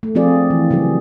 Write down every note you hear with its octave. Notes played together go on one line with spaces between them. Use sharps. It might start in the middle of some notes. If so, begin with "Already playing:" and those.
A3
F3 C4 F4 G#4 D5
E3
C#3 F#3 G3 G#4